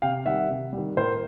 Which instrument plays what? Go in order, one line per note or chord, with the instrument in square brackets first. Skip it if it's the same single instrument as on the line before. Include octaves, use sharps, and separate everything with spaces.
[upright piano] C3 F5 G5
D#3 G3 E5 F#5
C3
D#3 G3
A2 A#4 C5